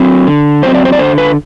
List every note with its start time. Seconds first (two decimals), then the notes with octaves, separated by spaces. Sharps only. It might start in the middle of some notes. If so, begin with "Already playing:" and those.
Already playing: F#3 C4
0.27 D3
0.63 F#3 C4 C5
0.74 D5
0.85 C5
0.92 D5
0.99 D3 C5
1.18 B4